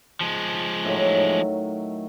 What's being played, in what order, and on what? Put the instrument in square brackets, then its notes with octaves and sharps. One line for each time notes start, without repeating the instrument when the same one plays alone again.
[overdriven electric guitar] F3 G#3
[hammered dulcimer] A2 D#3 F#3